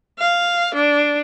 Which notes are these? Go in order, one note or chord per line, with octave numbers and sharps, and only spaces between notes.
F5
D4